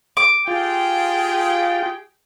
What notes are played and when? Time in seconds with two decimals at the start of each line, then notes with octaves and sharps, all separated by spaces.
0.17 D6
0.48 F4 G4 G#4 G5